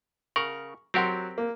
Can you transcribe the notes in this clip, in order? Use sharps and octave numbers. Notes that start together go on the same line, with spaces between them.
C#3 A#4 F#5 C#6
F#3 C4 G4 A#4 F#5 C6
A#3